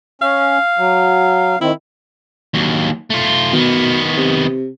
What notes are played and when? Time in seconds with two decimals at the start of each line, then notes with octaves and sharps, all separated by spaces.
0.22 C#4 F5
0.78 F#3
1.61 D#3 C4 E4
2.54 D#2 F#3
3.10 A3 F4
3.53 B2 D#3 B3
4.17 C3